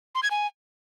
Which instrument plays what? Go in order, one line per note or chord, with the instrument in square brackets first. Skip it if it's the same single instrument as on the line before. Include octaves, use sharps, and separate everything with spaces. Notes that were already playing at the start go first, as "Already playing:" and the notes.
[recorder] C6
G#6
G#5